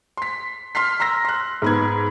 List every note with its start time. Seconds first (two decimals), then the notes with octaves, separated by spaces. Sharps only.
0.17 C6 B6
0.75 C6 F6 B6 C7
1.00 A#5 C6 E6 A#6
1.25 C6 F#6
1.62 G#2 B3 G#6